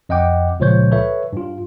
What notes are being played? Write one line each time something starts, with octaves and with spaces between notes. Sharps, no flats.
F2 D#5 F#5 G5 D6
C#2 A#2 F3 C5 C#5 G6
A4 B4 C#5 E5
G2 F4